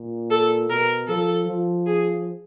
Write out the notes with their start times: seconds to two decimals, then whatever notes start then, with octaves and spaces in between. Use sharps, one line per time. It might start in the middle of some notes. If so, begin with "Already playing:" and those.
Already playing: A#2
0.31 A4
0.69 B2 A#4
1.08 F3 A4
1.47 F3
1.86 G#4